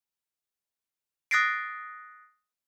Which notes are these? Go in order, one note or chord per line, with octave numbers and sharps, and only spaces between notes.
D#6 F#6 A6 A#6 C7 D7